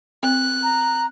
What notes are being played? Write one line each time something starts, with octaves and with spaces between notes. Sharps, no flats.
C4 F#6
A#5